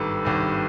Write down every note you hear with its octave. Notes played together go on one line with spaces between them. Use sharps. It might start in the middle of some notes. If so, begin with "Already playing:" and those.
Already playing: G#1 G2 D#3 A4 B4
G#1 G2 D#3